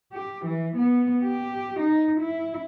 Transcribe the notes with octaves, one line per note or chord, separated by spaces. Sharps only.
G4
E3
B3
G4
D#4
E4